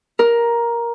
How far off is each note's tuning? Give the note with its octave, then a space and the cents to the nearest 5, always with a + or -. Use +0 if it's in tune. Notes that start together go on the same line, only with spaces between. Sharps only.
A#4 +10